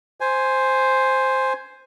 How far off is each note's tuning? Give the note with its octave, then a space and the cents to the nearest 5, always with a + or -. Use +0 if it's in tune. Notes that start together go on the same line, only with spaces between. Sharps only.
C5 +0 G#5 +0